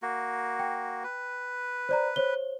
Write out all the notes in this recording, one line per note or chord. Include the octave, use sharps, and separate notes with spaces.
A#3 F#4
G5
B4
C5 D5 A#5
C5 C#5 G7